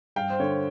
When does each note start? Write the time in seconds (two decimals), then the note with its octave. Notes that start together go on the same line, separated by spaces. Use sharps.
0.16 G2 F5 G5
0.30 C5
0.40 D3 C#5